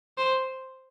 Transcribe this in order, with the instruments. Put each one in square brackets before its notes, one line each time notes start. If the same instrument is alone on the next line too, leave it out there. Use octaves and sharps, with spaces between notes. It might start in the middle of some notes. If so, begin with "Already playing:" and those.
[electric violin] C5